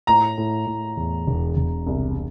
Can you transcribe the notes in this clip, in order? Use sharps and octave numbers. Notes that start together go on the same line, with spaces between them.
A2 A#5
A2
A2
E2
E1
E1
C2